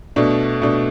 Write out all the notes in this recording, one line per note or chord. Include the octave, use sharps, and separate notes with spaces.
B2 A3 D4
B2 A3 D4